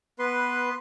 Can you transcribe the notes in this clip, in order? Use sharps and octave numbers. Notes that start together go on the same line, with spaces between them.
B3 B4 C6